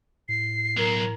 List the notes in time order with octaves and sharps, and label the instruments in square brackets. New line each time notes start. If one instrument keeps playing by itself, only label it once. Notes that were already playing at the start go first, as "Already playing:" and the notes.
[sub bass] A2 [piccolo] C7
[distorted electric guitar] B1 F#3 [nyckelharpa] A#4